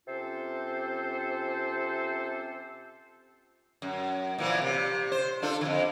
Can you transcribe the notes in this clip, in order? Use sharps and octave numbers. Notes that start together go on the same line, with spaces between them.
C3 C4 C#4 F4 A4 C5
F#2
A#2 E3 F3
C3
C5
D4 F4 A4
F2 D#3